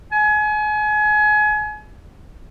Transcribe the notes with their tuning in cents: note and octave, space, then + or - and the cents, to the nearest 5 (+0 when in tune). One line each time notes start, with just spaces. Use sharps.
G#5 +30